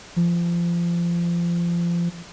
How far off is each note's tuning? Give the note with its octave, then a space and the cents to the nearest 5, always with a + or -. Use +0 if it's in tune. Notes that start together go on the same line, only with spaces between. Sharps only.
F3 -25